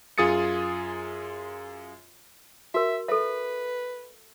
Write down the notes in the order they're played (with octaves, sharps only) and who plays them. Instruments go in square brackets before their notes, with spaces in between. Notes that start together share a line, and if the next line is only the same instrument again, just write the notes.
[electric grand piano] F#2 F4 G#4 D#6 A6 C#7
[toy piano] F#4 A#4 [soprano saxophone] E5
[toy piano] A4 E5 [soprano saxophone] B4